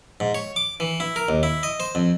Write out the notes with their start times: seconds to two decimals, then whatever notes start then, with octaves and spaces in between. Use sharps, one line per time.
0.20 G#2
0.35 C#5
0.56 D6
0.80 E3
1.00 E4
1.16 A#4
1.29 D#2
1.43 E4
1.63 D#5
1.80 C5
1.95 F2